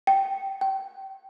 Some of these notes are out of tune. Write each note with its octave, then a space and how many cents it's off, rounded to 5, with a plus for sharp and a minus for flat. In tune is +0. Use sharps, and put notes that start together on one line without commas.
G5 -10
G5 -20